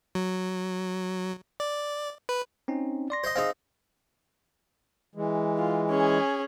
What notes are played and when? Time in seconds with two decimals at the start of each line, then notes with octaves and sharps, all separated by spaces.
0.15 F#3
1.60 D5
2.29 B4
2.68 C4 C#4 D#4
3.10 D5 C6 A#6
3.24 C5 D#5
3.36 C4 D#4 G#4 D#5 F5
5.15 E3 G#3
5.58 F4
5.89 C#4 G#4